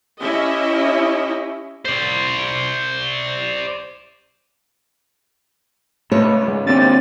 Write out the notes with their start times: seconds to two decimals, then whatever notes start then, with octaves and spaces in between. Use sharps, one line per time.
0.20 C#4 E4 G4 D#5 E5
1.85 C5 D5
6.12 C#2 A3 C#5 B5
6.48 G#3
6.67 D#2 C3 C4 D4 A6